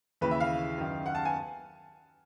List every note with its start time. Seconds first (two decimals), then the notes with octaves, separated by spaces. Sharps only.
0.21 D#2 C#3 E3 B4
0.31 E5
0.40 F5
0.78 F#2 D#3
1.06 F#5
1.15 A5
1.25 G#5